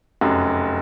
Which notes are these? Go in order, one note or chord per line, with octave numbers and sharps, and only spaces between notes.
F1 F#2